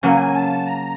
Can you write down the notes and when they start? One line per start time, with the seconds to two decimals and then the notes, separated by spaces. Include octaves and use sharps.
0.03 C#3 F#3 A#3 G#5
0.34 A5
0.66 A#5